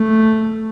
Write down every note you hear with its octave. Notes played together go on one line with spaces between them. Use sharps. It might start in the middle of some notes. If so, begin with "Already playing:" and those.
Already playing: A3